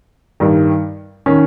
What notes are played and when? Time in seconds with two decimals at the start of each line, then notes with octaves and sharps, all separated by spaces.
0.40 G2 D#3
1.26 D#3 C#4